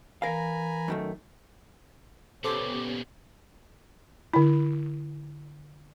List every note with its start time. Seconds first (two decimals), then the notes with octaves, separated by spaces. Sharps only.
0.22 E3 A#4 F5 G#5 A#5 B5
0.88 F#2 D#3 A3
2.44 A#2 C#3 B3 C#4 G4 A4 C5 D6
4.34 D3 E4